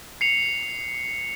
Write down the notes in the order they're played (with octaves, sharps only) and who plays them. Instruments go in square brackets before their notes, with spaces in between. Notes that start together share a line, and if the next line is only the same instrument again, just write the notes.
[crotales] C7 C#7 F7